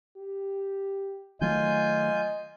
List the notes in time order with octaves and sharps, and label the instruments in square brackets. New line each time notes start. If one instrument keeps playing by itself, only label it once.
[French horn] G4
[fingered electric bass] D#3 F#3 A3 [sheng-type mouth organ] F4 G#5 G6 [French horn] D#5